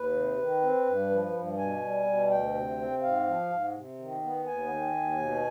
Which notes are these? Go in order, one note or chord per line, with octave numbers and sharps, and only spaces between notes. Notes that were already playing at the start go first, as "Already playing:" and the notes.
Already playing: D#2 B4
C3
D#3
C4
G2
F3
G2
B2 G#5
G3
B2
D2 G5
C3
C4
G#2 F5
F3
G#2
C3
D#3
B3
D#2 G#5
D#3
D#2
B2